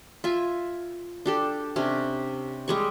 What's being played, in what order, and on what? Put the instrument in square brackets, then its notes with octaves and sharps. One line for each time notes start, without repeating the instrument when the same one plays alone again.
[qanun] F4 E5 G#5
D4 G4 A4
C3 C#4 D4
G3 G#3 C#6